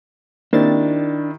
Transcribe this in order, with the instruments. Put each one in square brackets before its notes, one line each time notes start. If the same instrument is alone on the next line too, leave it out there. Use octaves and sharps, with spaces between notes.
[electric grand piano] D#3 E4 G4 [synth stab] A#3 C4 A6 [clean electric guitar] D4